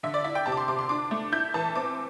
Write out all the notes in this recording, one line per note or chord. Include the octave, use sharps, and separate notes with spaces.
D3 E5
D5
E4 E5
G5
C3 A5
D6
C6
C3 D6
C6
D4 D6
A3
E4 G6
E3 A5
C4 D6